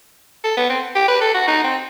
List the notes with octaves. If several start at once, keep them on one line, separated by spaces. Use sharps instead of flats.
A4
B3
C4
G4
B4
A4
F#4
D#4
C4